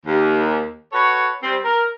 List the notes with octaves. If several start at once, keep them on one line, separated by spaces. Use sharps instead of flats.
D#2
F#4 A4 B4 C#5
G3 C4
A#4